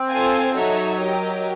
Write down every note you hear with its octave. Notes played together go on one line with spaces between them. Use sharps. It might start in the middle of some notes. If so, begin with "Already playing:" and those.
Already playing: C4
F4 A4 C5 F5 G#5
F#3 D#4 F#4 A4 C#5 E5
G4 A#4 D#5